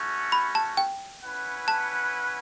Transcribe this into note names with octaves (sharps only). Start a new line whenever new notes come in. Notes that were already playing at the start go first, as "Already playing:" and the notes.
Already playing: A3 C#4 F#4
B5
A5
G5
C#4 E4 B4 F#5
A5